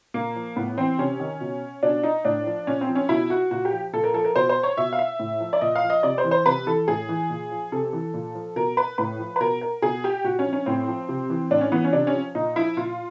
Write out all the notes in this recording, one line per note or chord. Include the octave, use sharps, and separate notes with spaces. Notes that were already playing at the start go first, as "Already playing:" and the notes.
A#2 A#3
F3
A2 B3
E3 C4
C3 C#4
D#3
B2
B2 D4
D#4
A2 D4
F3
A#2 C#4
C4
F3
C#4
B2 E4
F#4
A#2 F#4
G4
F3
A#2 A4
A#4
F3 A4
A#4
B2 C5
C5
C#5
B2 E5
F5
E5
A2
F3
D5
A#2 D#5
F5
F3
D#5
C3 D5
C5
E3
C5
C3 B4
E3 A4
A2 G#4
E3
A#2
F3
C3 A4
E3
A#2
F3
B2 A#4
B4
A2 B4
F3
B4
B2 A#4
A#4
B2 G#4
G4
A#2 F#4
C#4
F3
C#4
A2 C4
F3
C3
E3
A2 D4
C#4
E3 B3
C#4
C3 D4
C#4
F3
A#2 D#4
F3 E4
A#2 F4